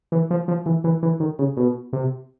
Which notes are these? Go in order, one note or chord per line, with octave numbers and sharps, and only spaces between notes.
E3
F3
F3
E3
E3
E3
D#3
C#3
B2
C3